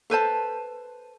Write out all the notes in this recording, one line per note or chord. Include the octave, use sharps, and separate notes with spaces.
A4 B4 C5 A5